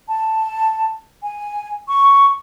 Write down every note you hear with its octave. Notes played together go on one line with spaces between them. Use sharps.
A5
G#5
C#6